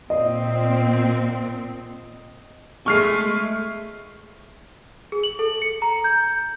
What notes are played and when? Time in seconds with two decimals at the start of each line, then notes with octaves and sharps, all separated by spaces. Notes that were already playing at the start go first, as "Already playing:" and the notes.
0.10 A#2 C4 D#5
2.86 G#3 A3 C#6 F6 C7
5.12 G#4
5.23 F#7
5.39 A4
5.62 C#7
5.82 A#5
6.04 G6